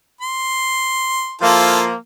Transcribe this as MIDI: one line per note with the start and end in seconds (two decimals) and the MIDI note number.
0.21 1.35 84
1.41 1.93 53
1.41 1.93 58
1.41 1.82 64
1.41 1.82 65
1.41 1.82 69